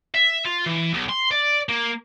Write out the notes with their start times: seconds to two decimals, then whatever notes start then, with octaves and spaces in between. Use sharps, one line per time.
0.15 E5
0.46 F4
0.66 E3
0.94 B1
1.09 C6
1.31 D5
1.69 A#3